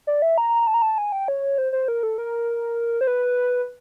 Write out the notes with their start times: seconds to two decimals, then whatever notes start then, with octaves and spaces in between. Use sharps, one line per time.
0.07 D5
0.22 E5
0.38 A#5
0.67 A5
0.74 A#5
0.82 A5
0.98 G#5
1.12 G5
1.28 C#5
1.58 C5
1.73 C5
1.88 A#4
2.03 A4
2.18 A#4
3.01 C5
3.07 B4